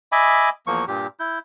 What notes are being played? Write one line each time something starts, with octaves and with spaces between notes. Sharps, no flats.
D#5 E5 G#5 B5 D6
E2 F3 A#3 C#6
G2 A#2 G4
E4 G6